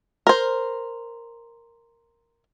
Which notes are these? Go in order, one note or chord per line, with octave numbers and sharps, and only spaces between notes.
A#4 C5